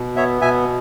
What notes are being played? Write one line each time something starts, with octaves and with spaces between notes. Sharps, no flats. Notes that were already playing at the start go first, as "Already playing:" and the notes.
Already playing: B2
B3 C#5 E5
B2 E5 G#5